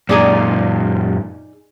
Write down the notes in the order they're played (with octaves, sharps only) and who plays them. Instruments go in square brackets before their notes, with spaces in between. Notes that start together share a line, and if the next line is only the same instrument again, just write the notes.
[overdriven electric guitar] F#2 A#2 [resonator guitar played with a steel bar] D#4 G#4 D5